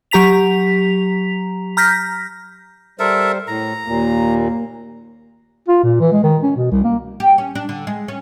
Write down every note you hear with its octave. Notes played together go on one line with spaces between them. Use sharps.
F#3 G4 A#5 B6 F7
A#5 F6 G6 A#6 B6
G3 A4 A#4 C5 E5
A2 A#5
D#2 A#2 A#3
F4
A#2
E3
G#3
D#3
C#4
B2
C2
A#3
G4
C#4
D4
D3
G#3
C#4